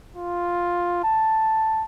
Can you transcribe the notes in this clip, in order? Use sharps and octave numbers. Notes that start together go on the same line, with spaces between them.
F4
A5